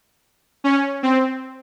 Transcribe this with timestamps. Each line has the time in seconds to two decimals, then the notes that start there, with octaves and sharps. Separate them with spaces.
0.64 C#4
1.03 C4